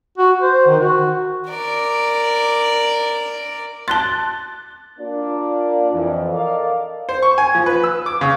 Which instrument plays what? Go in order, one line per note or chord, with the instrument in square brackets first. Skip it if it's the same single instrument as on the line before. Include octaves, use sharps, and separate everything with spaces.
[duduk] F#4
C5
D#3
F#4
[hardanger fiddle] A#4 D5
[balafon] A5 C6 [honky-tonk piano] F#6 A6
[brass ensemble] A#3 D4 F4 D5
F2 E3
A4 A#4 D5 D#5 F5
[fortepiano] C5
C#6
G#5
F3
B4
E6
D6
C#3